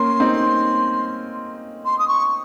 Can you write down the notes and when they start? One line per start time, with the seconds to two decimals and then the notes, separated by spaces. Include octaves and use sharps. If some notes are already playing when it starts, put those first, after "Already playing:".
Already playing: A#3 C#4 C6
0.20 C4 D#4
1.85 C6
1.99 D#6
2.08 C#6